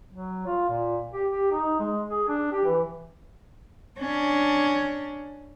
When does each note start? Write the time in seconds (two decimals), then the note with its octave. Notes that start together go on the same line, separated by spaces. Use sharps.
0.13 F#3
0.47 F4
0.69 A#2
1.14 G4
1.29 G4
1.52 D#4
1.80 G#3
2.09 G#4
2.28 D4
2.52 G4
2.65 E3
3.99 C#4 D4